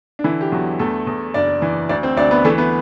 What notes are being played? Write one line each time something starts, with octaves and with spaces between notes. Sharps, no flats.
D4
D3 E3 E4
G4
E2 F#3 F#4
E2 A3 A4
E2
F#1 D4 D5
E3
D2 D4 D5
C4 C5
D2 D4 D5
B3 B4
E3 A3 A4
B3 B4